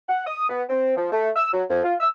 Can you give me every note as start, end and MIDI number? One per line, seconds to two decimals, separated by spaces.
0.08 0.24 78
0.27 0.49 87
0.49 0.63 59
0.69 0.94 60
0.97 1.11 53
1.12 1.29 57
1.36 1.49 88
1.53 1.63 54
1.69 1.80 41
1.84 1.94 65
2.00 2.08 88